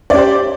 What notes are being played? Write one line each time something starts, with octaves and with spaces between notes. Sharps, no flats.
C#4 G4 C5 D5